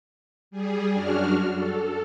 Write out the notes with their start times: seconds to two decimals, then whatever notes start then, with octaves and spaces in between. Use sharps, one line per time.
0.51 G3 G#4
0.93 F#2 D4 F#4 F6
1.51 A4